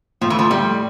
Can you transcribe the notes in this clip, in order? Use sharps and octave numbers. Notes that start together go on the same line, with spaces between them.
A2 F3
E3
F3
A2 G3